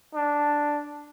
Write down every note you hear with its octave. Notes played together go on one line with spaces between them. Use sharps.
D4